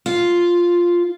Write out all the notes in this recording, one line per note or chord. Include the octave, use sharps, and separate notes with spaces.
F4